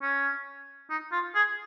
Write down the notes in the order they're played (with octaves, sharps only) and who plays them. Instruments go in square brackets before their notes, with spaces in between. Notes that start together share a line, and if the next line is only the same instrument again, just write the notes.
[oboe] C#4
D#4
F4
G#4